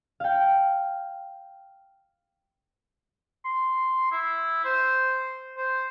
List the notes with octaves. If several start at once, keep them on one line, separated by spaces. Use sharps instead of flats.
F5 G5
C6
E4
C5
C5